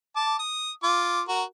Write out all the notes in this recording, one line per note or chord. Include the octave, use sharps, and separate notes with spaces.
A5 D6
D#6
F4 D6
F#4 A#4